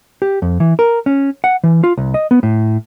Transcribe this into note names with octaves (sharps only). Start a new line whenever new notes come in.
G4
F2
E3
A#4
C#4
F#5
E3
F4
C2
D#5
B3
A2